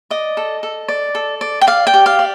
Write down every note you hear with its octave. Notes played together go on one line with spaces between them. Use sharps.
D5 D#5
A4
A4
D5
A4
D5
G5
D5 F5
G5
G4
F5
D5